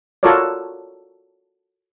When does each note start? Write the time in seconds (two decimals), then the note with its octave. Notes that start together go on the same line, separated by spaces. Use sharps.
0.23 F4 F#4 A4 A#4 C#5 D5